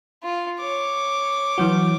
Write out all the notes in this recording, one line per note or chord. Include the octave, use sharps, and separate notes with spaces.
F4
C#5 D6
E3 F#3 F#4